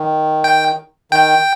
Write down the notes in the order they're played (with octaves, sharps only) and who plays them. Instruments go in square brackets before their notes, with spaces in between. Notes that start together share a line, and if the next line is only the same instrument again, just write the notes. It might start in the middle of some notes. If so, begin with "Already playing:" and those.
Already playing: [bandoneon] D#3
[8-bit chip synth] G5
[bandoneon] D#3 [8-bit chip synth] G5